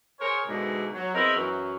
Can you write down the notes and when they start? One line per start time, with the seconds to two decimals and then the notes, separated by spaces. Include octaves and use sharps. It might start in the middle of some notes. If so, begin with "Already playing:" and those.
0.20 G#4 A#4 C5 C#5
0.46 G#2 B2 D3 E3 G#3 A#3
0.93 F#3
1.14 B3 C4 D#4 E4 G#4 A#4
1.36 F#2 E3 F#3